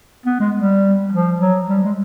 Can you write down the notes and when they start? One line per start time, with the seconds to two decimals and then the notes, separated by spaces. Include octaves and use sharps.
0.26 B3
0.40 G#3
0.55 G3
1.13 F3
1.41 F#3
1.69 G3
1.83 G#3